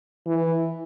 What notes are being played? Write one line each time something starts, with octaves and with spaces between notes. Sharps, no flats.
E3